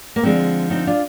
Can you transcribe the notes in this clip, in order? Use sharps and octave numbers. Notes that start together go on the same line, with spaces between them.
A#3
D3 F3 G#3 C4
C4 D#4
D4 F4